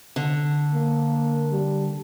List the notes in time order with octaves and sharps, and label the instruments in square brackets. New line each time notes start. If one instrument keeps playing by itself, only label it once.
[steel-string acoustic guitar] D3
[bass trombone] A#3
G3